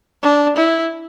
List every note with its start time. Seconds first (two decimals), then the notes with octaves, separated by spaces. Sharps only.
0.23 D4
0.57 E4